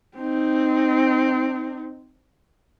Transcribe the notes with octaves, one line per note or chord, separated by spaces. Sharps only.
C4 D#4